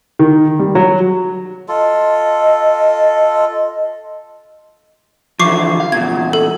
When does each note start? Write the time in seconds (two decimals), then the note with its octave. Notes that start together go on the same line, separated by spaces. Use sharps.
0.19 D#3
0.59 G3
0.75 F#3
1.68 F4 A4 D#5
5.40 D3 E3 F3 C#6 D6 C7
5.80 F5
5.92 E2 A#2 G#6
6.33 A4